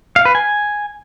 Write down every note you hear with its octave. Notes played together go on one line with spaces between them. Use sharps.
F5
B4
G#5